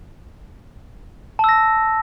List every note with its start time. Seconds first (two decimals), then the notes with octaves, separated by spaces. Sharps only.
1.39 A5
1.44 E6
1.49 A#6